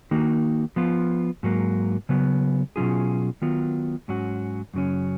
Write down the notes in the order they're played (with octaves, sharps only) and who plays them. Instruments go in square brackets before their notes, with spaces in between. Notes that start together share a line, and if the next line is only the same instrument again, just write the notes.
[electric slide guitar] D#3 A#3 D#4 F#4
F3 B3 F4
G#2 F#3 A#3
C#3 F#3 B3
B2 F#3 C#4 F4 G#4
D#3 F#3 B3 F4
G#2 F#3 C#4 F#4
F#2 C#3 F#3 C#4